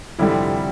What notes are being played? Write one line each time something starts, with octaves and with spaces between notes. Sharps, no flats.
F1 F2 D3 G3 E4